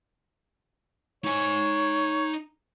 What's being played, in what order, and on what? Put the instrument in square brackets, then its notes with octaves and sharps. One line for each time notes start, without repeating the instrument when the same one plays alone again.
[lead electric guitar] D#4 G#5 [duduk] C#5